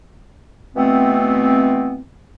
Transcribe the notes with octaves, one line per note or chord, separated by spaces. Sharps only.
B2 E3 A3 B3 C4